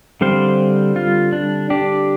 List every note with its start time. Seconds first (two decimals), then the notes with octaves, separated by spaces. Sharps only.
0.21 D3 G3 C4 C5 F5
0.96 F4
1.33 D4
1.70 D4 G4